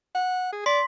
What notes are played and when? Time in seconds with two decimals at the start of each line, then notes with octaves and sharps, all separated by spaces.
0.15 F#5
0.52 G#4
0.66 D5 C6 B6